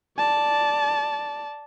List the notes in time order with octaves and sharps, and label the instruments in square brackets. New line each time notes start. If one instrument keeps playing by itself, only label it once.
[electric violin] D5 A5